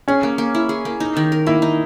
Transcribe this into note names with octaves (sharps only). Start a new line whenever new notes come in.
C#4 G#4
A#3
A#3
E4
G#4
A#3
D#4
D#3
A#4
A#3 E4
D#4